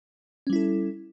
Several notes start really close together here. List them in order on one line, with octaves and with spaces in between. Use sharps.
C#4 G3 E4 A4